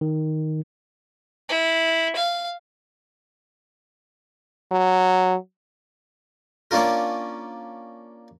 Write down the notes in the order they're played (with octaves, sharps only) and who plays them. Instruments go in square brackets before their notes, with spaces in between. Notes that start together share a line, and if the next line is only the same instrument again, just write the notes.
[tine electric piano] D#3
[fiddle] E4
F5
[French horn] F#3
[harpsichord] A#3 C#4 D4 F4 A#4